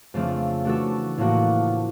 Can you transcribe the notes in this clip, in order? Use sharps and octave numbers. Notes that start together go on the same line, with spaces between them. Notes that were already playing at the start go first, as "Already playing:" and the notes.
F2 C#3 F3 A3 D4
E3 A3 D4 F#4 A4
A2 F3 A#3 D4 F#4